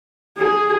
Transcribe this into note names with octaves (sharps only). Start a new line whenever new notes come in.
G#4